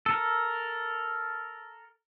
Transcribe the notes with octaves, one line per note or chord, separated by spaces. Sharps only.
A4 A#4